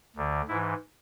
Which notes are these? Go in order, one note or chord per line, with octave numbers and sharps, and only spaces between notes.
D2 D3
G#2 E3 E4